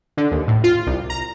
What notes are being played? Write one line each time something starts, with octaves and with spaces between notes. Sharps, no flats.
D3
D#2
A2
F4
C2
A#5